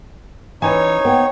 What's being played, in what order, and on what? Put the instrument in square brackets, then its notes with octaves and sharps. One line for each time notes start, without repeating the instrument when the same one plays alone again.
[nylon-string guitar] E3 C#4 [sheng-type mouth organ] D#4 C#5 [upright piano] G#5
[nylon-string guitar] B3 C5 G5